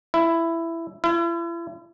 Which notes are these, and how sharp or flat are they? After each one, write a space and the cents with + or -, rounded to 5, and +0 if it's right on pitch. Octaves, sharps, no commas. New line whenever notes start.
E4 +10
E4 +40